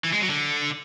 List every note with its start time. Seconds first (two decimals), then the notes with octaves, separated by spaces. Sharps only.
0.04 E3
0.13 G#3
0.21 F#3
0.30 D3